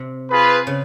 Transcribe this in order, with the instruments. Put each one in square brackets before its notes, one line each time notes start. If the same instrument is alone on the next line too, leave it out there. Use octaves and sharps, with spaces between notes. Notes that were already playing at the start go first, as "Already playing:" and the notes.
Already playing: [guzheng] C3
[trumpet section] F4 G#4 B4
[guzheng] C#3